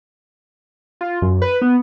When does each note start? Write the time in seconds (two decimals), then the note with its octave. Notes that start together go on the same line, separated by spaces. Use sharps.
1.01 F4
1.22 F#2
1.42 B4
1.62 B3